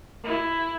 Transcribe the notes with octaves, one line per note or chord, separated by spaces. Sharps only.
E4